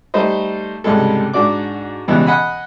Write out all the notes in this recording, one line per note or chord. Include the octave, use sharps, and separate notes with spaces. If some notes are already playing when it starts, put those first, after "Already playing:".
G3 A3 D#4 A4 C5 D#5
C#2 G#2 C3 G3 G#3 A4
G#2 D4 F#4 D5 D6
C#2 B2 E3 G3
D#5 F#5 G#5 B5